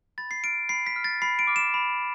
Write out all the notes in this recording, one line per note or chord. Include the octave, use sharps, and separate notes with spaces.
B5 A6
C7
F6 D7
B5 C7
B6
F6
A6
B5 C7
D7
D6 F6
E7
B5